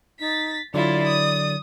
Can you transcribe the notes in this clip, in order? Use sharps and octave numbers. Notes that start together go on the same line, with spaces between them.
D#4 A6 B6
D3 F#3 E4 F4 D5
D#6